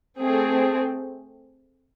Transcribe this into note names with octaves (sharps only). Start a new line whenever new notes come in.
A3 C4 G#4